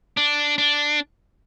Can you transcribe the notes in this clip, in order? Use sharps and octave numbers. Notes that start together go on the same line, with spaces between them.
D4
D4